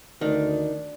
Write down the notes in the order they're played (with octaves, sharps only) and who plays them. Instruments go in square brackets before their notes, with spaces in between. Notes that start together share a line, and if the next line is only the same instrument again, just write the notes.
[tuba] D2 [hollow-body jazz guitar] D#3 [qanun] D4